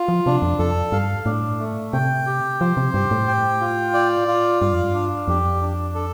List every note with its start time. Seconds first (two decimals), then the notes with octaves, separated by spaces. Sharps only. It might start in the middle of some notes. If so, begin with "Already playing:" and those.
Already playing: F4
0.08 F3
0.26 C3 D4
0.42 F2
0.59 F2 A4
0.92 G2 F5
1.26 A2 D4
1.60 A3
1.93 C3 G5
2.27 G4
2.61 F3 C5
2.77 C3
2.94 G2 G4
3.11 A2
3.28 G5
3.61 F4
3.94 D5
4.28 F4
4.61 G2 F5
4.72 F2
4.84 G2
4.94 D4
5.28 F2 G4
5.62 D4
5.95 A4